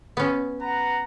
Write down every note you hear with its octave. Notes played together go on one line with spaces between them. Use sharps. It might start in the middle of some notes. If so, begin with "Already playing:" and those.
B3 C#4
B4 F#5 A#5